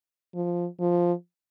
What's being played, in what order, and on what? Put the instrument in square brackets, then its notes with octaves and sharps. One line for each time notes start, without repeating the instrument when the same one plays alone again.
[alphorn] F3
F3